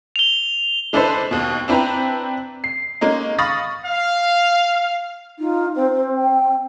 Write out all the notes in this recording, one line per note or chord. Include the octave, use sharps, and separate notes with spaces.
F7 G7
G#3 D4 E4 A4 B4 C5
D#2 B2
C4 D4 E4 B4 G5 A#5
C7
G#3 A#3 C#4 D#4
F5 B5 C#6 D#6 A6 A#6
F5
D#4 F4
C4 C5
C4
G5